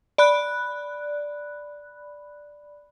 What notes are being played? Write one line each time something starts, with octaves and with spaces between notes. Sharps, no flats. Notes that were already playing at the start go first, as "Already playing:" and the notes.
D5 B5 F#6